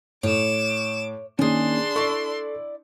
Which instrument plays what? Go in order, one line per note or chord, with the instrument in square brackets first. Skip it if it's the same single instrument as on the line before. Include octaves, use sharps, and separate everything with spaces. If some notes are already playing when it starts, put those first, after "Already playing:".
[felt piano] A2 [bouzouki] C#5 [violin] D6 E7
[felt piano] D#3 [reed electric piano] A#3 C#4 [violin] D4 C6 [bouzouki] G#4 G#5
[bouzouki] E4 D5 [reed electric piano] A4 [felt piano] C#6